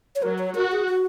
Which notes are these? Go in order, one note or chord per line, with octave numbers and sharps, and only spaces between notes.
C#5
F#3 A#4
C#5
F#4 A#4
G#4
F#4